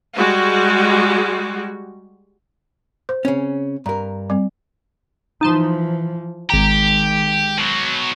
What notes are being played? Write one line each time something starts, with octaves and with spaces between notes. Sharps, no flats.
G3 G#3 F#4
C5
C#3 C4 C#4
G2 A#4 A#5
G3 C4
E3 F3 D#4 A5 C6
G#1 D#3 G#3 G4 A#5
B2 F#3